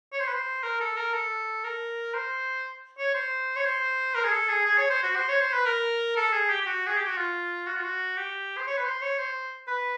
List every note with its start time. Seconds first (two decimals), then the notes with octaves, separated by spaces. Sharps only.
0.13 C#5
0.20 C5
0.28 B4
0.34 C5
0.63 A#4
0.81 A4
0.97 A#4
1.13 A4
1.64 A#4
2.14 C5
2.99 C#5
3.14 C5
3.56 C#5
3.65 C5
4.15 A#4
4.24 G#4
4.32 A4
4.49 G#4
4.66 G#4
4.78 C#5
4.90 C5
5.03 F#4
5.16 C5
5.28 C#5
5.41 C5
5.53 B4
5.66 A#4
6.17 A4
6.33 G#4
6.50 G4
6.62 G4
6.67 F#4
6.87 G#4
6.97 G4
7.07 F#4
7.17 F4
7.67 F#4
7.77 F4
7.85 F#4
8.17 G4
8.57 C5
8.67 C#5
8.78 B4
8.85 C5
9.02 C#5
9.18 C5
9.68 B4